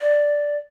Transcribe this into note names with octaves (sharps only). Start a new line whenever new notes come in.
D5